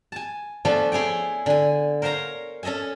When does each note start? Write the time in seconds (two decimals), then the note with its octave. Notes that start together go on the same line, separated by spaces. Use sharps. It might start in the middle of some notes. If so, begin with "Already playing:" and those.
0.12 G#5 A5
0.65 F3 A3 B3 D4 E5 G#5
0.92 E4 G#4 C#5 G5
1.46 D3 G#5
2.02 A#4 C5 C#5 F5 A#5
2.63 C#4 A4 D#5 E5 G#5